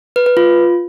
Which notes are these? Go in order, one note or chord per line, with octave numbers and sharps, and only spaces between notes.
B4
B4
F4